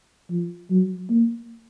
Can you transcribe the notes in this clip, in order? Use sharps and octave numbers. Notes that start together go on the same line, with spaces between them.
F3
F#3
A#3